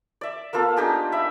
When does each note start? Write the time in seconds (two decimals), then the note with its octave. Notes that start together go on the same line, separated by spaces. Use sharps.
0.21 D5 E5
0.53 A#3 B3 F4 A4
0.77 D4 D#4 G4 G#4
1.12 E5 B5